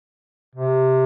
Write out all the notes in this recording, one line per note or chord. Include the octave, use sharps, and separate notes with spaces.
C3